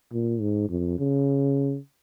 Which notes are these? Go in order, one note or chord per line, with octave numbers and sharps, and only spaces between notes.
A#2
G#2
F2
C#3